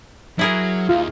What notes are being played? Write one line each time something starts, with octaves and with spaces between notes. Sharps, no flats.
F#3 E4 G#4 A#4
D#2 F4